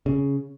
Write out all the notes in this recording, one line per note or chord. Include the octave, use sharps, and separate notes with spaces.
C#3